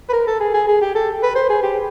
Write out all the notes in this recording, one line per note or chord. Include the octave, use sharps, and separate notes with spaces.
B4
A#4
A4
G#4
G#4
G#4
G4
A4
B4
C5
G#4
G4